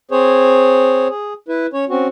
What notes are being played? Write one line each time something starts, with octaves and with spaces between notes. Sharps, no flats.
C4 G#4 C5 C#5
G#4
E4 B4
C#4 C#5
C4 C#4 F#4